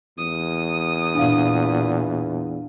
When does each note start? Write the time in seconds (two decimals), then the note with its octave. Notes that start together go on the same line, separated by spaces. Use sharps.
0.18 E2 D#6
1.14 A#2 D4 F5